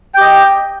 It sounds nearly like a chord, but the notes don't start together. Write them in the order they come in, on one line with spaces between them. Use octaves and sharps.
G5 G4 D#5